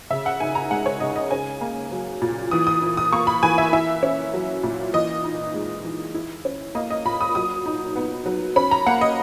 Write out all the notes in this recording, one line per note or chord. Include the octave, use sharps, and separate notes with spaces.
C#3 E5
F#5
D#4 G#5
A#5
G#3 F#5
C#5
C#3 D#5
D#5
C#4 G#5
A#3
F#3
A#2
E3 D#6
D#6
E4
D#6
A#3 C#6
B5
E3 G#5
E5
E4 E5
C#4
F#3
A#2
E3 D#5
D#4
G#3
E3
E4
C#4
A#3 D#5
D#5
A#2 B5
D#6
F#3 D#6
D#4
B3
F#3
C#4 B5
A#5
A#3 F#5
D#5